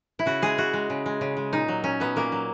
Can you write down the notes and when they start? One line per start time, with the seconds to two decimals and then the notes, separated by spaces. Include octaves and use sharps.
0.19 E4
0.26 C#3 F#4
0.42 G#3 G#4
0.58 C#3 F#4
0.74 G#3
0.90 C#3
1.06 G#3
1.21 C#3
1.37 G#3
1.53 A#2 D#4
1.68 F#3
1.84 A#2 C#4
2.00 F#3 B3
2.16 A#2 A#3
2.32 F#3